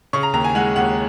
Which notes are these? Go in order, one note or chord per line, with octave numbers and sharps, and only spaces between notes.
C#3 C#6
A#5
D#2 A#5
G#5
G#3 F#5
D#2 F#5